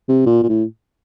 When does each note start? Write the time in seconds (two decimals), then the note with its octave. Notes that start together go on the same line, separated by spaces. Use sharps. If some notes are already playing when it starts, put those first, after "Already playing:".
0.09 C3
0.26 A#2
0.43 A#2
0.49 A2